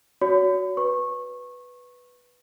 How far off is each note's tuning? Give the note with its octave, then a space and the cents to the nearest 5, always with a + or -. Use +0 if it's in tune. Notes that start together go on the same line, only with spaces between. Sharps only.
F#4 +0 C#5 +40 B5 +40
B4 +0 C#6 -20